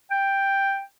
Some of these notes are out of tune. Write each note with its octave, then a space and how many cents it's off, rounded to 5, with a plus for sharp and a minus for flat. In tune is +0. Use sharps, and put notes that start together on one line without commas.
G5 +5